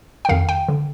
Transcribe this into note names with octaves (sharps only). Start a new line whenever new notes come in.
G5
F2 D#3 F5
G5
D3